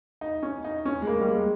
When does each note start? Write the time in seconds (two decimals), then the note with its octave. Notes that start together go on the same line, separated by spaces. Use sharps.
0.21 D#4
0.43 C#4
0.64 D#4
0.85 C#4
1.02 G#3
1.07 A#3
1.21 G3
1.29 G#3